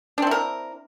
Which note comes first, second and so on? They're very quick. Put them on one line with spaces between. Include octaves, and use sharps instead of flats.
D4 C4 E4 A#4